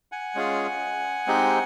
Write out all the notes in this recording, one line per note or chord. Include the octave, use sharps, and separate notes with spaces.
F#5 G#5
G#3 C#4 F4 G#4
G#3 C4 D#4 G4